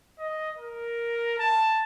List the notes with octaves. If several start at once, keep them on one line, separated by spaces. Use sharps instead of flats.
D#5
A#4
A5